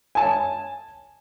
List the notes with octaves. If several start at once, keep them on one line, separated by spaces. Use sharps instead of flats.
G#5 A5